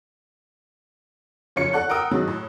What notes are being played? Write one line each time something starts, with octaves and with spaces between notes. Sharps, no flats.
F#1 C#3 F3 F4 C#5 C#7
A4 D5 F#5 C#6 F#6
A#4 F#5 G5 D#6 E6
G2 D#3 F#3 G#3
A2